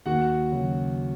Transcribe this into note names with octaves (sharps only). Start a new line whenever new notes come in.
D#2 F#4 F#5
C#3 F#3